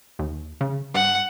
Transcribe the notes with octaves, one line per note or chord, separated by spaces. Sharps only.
D#2
C#3
G2 F#5